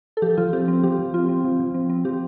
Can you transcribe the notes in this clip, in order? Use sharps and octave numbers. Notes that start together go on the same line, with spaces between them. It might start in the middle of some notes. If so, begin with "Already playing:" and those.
A4
F3 G4
F3 F4
C4 G4
C4
F3 G4
F3
C4 F4
C4
F3
F3
C4
C4
F3 G4